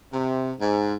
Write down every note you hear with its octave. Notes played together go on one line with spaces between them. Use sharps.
C3
G#2